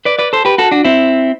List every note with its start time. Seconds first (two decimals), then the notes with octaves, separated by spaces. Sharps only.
0.05 B4 D5
0.19 B4 D5
0.33 A4 C5
0.45 G4 B4
0.58 F#4 A4
0.71 D4 F#4
0.84 C4 E4